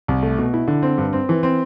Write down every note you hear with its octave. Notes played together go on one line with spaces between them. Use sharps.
C2
A3
B2
E4
D3
C4
G2
C4
E3
C4